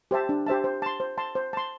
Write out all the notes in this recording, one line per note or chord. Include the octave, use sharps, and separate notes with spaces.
G4 C5 E5 A5
D4
G4 C5 E5 A5
C5
A5 C6
C5
A5 C6
C5
A5 C6